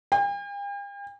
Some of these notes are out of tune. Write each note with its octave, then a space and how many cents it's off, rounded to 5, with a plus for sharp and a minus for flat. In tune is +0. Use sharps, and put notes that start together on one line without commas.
G5 +45